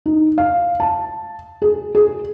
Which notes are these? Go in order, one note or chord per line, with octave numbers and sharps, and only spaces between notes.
D#4
F5
A5
G#4
G#4